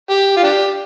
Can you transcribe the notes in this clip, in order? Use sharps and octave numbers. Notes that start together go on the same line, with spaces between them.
G4
F4
D4 G4